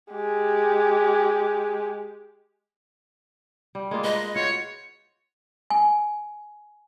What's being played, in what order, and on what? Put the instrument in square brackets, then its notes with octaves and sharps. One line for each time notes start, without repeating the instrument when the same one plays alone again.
[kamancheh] G#3 G4
[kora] G3
G#3 A#3 F4
[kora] B4 [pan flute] D#5
[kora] F4 F#4 C5 [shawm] C#5
[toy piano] G#5